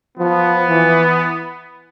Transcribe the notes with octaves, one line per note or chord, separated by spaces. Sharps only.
F3 B3
E3